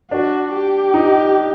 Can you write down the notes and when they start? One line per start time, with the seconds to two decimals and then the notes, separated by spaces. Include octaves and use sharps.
0.11 D4 F#4
0.53 G4
0.94 D#4